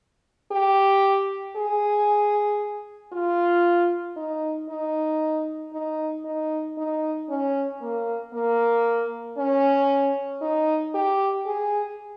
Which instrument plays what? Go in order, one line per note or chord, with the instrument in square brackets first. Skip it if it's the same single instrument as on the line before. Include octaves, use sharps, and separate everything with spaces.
[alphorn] G4
G#4
F4
D#4
D#4
D#4
D#4
D#4
C#4
A#3
A#3
C#4
D#4
G4
G#4